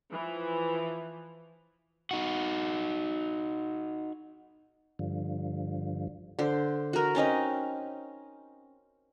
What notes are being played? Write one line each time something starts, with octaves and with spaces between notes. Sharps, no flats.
E3 F3
D#4 F#4
G2 D3 F3
D3 C5
F#4 A#4
C4 C#4 D#4 D#5